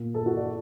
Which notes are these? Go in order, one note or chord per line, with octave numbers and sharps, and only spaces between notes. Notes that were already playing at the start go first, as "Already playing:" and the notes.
Already playing: A#2
A4
F#4
D5